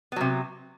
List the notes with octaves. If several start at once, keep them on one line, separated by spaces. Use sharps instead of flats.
C3 F#3 B3